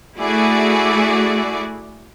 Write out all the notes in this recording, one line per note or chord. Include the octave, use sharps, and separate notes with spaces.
A3 E4 F#4 G#4 D5